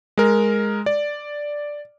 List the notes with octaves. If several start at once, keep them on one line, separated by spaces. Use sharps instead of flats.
G#3 A#4
D5